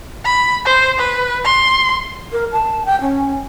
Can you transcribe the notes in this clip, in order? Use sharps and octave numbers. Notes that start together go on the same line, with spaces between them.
B5
C5
B4
C6
A#4
A5
G5
C#4